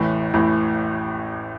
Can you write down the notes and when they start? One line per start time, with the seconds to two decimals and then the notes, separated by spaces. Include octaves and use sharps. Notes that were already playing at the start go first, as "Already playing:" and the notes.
Already playing: A1 A2 E3 C#5 E5
0.34 A1 A2 E3